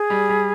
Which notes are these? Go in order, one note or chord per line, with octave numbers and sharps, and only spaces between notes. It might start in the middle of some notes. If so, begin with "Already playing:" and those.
Already playing: G#4
G3
G3